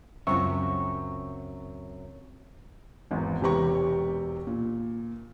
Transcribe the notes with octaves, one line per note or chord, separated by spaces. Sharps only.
C#2 F#2 F#3 C4 F4 E5 C#6
G#1 E2
E1 C3 E3 G4 A#5 C#6
A#2